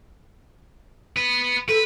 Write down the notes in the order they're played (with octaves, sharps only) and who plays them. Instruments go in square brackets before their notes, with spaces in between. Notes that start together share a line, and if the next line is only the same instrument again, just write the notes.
[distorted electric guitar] B3 B4
[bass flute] A4 [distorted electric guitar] B4